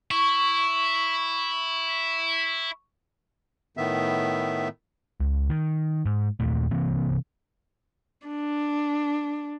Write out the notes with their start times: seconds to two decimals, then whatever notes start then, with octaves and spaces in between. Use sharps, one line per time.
0.11 E4 C#6
3.77 A2 D#3 B3 E5
5.20 C#2
5.50 D#3
6.06 G#2
6.40 D#2 A#2 A3
6.71 C3 E3 A#3 C4
8.27 D4